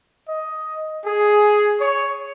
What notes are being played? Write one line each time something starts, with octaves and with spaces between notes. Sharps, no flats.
D#5
G#4
C#5